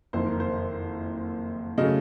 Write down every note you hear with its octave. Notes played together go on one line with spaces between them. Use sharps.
F#1 F2 D#3 C5
A#4
C5
C#3 F#3 A3 C#4 D#5